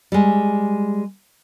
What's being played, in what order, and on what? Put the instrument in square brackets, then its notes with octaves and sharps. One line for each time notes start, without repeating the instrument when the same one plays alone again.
[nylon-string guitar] G3 G#3